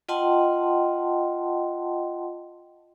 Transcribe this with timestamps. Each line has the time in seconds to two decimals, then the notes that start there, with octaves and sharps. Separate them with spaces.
0.09 F4 D#5 F#5 G5 A5 C6